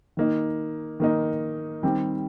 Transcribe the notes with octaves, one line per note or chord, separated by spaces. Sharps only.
D#3 A#3 D#4
D#3 A#3 D#4
D#3 G3 C4 G4